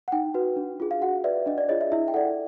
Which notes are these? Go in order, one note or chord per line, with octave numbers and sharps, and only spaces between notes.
F#5
D#4 G5
F#4 B4
D4
F4 G#4
F5
F#4 F#5
B4 D5 E5
D4 D#5
D5
F4 G#4 C#5 D#5
E5
E4 E5
G5
A4 D5 F#5